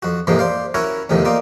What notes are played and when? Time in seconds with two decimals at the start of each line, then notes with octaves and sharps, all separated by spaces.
0.02 F2 F#4
0.27 F2 G#2 C3 E3 F3 A#3
0.39 C5 D5 F5
0.74 C#4 E4 F#4 A#4 C#5
1.09 E2 A2 C3 D#3 F3
1.25 A#3 D#4 F4 D5